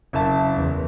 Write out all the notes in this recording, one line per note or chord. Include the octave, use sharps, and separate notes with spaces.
F#1 E5 A5
E2